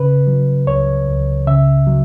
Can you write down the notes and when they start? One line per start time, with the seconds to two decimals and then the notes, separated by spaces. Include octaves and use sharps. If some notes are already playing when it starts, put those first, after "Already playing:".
Already playing: C#3 B4
0.27 F#3
0.67 C#2 C#5
1.07 C#2
1.47 C#3 E5
1.87 F#3